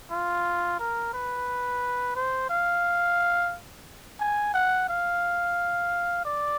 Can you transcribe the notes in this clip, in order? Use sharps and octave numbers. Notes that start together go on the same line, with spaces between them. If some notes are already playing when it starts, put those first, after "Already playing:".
F4
A#4
B4
C5
F5
G#5
F#5
F5
D5